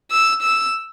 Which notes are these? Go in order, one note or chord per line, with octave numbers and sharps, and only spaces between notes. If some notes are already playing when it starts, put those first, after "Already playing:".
E6
E6